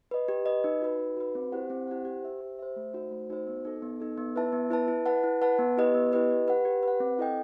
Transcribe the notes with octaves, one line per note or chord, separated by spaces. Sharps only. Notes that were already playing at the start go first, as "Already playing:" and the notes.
B4 D#5
G4
B4 D#5
D#4
F#4 B4
D#4
F#4 B4
C4
E4 G4 C5 F#5
C4
E4 G4 C5 F#5
G4
C5 E5
G4
C5 E5
A3
D#4 F#4 C5
A3
D#4 F#4 C5
B3
D#4 A4
B3
D#4 A4
B3
E4 B4 E5 A5
B3
E4 B4 E5 A5
E4
B4 F#5 A5
E4
B4 F#5 A5
B3
E4 G4 B4 D#5
B3
E4 G4 B4 D#5
G4
B4 F#5
G4
B4 F#5
C4
E4 A4 D#5 G5